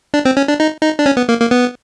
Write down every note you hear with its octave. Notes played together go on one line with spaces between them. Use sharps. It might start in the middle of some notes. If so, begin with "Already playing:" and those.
D4
C4
C#4
D4
D#4
D#4
D4
C#4
B3
A#3
A#3
B3